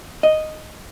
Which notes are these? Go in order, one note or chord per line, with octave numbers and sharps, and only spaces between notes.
D#5